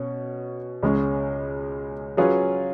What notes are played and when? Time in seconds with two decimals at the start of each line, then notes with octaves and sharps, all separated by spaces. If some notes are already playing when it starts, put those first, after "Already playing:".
Already playing: B2 C#4
0.83 C#2 C#3 G#3 C#4 G#4
2.17 F#3 C#4 F4 G#4 B4